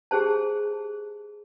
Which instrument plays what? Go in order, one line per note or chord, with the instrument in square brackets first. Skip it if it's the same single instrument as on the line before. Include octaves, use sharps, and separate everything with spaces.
[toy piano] G4 G#4 C5 A5